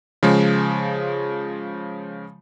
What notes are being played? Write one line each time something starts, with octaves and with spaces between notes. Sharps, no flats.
C#3 F3 G#3